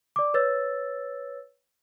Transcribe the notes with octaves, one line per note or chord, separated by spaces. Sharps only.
D5 D6
B4 C#5 E6 A6